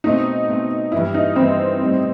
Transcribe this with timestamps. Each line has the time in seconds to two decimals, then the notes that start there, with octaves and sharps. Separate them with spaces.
0.04 B2 A3 C4 D#4
0.48 B2 A3 C4
0.92 G2 E3 B3 E4
1.14 D#4
1.36 G2 E3 B3 C4
1.80 A2 G3 B3